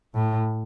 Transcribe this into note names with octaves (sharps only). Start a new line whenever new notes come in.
A2